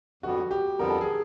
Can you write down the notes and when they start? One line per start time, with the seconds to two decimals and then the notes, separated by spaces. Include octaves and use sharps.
0.23 F2 D3 G3 B3 F#4
0.51 G4
0.79 F2 D3 G3 B3 A#4
0.90 A4
1.01 G#4